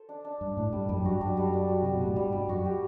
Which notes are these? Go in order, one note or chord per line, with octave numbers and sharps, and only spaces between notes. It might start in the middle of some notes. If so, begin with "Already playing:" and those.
Already playing: A4 C5
D4
D4
G2 D4
A2 D4
G2 G3
F#2 G3
G2 F#4
F#2 D4
G3
D4
F#4
C3 G3
B2
A2 G3
G2 G3
G3
F#2 F#4
G4